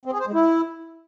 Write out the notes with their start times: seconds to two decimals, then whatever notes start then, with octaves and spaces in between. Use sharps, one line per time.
0.05 C4
0.13 G#4
0.20 C5
0.27 G#3
0.34 E4